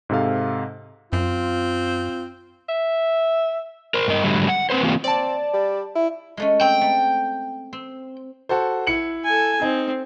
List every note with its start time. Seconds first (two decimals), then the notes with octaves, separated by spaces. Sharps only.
0.09 G#2 C3 A4 F5
1.13 F#2 C4 F4
2.69 E5
3.94 A#4 C5
4.08 G2 A#4 D#5
4.23 G#2 D3 F#3 G3 A3
4.48 F#5
4.70 C4 B4 C5
4.83 E3 A3 A#3 C4 F4 G4
5.04 C4 D5 A5
5.54 G3
5.95 E4
6.37 G#3 A3 C#4
6.61 C4 G5
6.81 A3
7.73 C4
8.49 F#4 A4 C5
8.87 E4 C#7 F#7
9.25 A4 G#5
9.62 C4 D#4